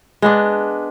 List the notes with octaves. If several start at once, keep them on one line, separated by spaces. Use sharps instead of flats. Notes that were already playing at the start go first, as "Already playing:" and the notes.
G#3 B3 D4